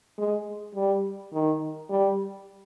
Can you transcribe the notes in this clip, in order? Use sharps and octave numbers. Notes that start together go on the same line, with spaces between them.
G#3
G3
D#3
G3